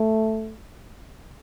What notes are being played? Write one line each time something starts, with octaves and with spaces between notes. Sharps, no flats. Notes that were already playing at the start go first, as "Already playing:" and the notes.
Already playing: A3